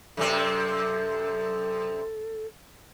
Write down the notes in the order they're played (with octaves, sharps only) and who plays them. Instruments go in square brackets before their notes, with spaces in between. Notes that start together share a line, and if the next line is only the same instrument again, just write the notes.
[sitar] F#2 C3 C4 [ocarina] A4